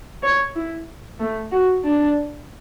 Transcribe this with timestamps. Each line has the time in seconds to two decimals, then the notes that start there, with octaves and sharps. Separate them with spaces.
0.23 C#5
0.55 E4
1.19 A3
1.52 F#4
1.84 D4